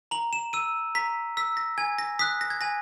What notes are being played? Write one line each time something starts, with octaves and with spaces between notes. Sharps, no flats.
A#5 F#7
E7
E6 D#7
A#5 B6
E6 B6
A#6
G#5 G#6
A#6
D#6 F#6 B6
A#6
G#6
G#5 A#6